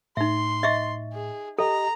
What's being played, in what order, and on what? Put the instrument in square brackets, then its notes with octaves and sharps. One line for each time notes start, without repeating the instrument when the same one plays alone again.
[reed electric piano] A2 [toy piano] D#4 E5 [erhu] C6
[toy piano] D#5 E5 C#6
[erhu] G#4
[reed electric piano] G4 D#5 [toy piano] A4 [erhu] A#5